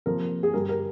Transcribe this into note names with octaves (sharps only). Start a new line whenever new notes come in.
C3 F3 A#3 A#4
G#4
G2 D3 G3 A#4
A#4